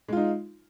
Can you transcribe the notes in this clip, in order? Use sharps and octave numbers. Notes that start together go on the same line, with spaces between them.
G#3 D#4 F4